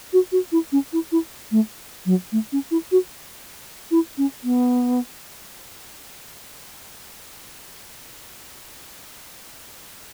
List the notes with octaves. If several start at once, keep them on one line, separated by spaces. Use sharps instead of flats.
F#4
F#4
E4
C#4
E4
E4
A3
F#3
A3
C#4
E4
F#4
E4
C#4
B3